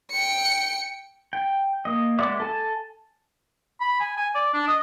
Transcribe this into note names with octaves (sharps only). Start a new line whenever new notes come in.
G5 C#7
G5
A#3 D#5
G#3 B3 D5 E5 D6
A4 G#5 A5
B5
G#5
G#5
D5
D4
D#5